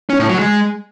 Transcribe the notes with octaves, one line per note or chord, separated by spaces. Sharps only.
C#4
A2
F#3
G#3